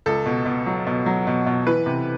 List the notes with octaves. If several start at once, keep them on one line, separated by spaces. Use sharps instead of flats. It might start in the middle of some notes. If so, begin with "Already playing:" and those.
C#2 A4
B2
B2
F#3
B2
F#3
B2
B2
E3 B4
C3